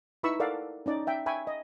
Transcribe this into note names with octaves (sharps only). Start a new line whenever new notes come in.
D#4 E4 B4 B5 C#6 E6
A4 A#4 D5 F5 F#5
C#4 D#4 D5
E5 G5
E5 G5 G#5 B5 C#6
D#5